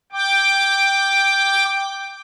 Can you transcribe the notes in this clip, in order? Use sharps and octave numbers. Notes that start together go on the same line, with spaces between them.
G5 D6